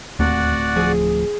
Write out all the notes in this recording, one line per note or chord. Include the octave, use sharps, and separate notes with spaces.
D1 D#2 A3 C4 F#4 D5 F#5
F3 G#4